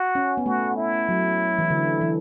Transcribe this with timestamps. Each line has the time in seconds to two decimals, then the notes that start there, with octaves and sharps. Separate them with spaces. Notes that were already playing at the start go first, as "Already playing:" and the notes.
Already playing: F#4
0.15 C#4
0.37 B3
0.46 A3 F#4
0.77 E4
1.09 F#3
1.59 E3
1.70 D3
2.01 E3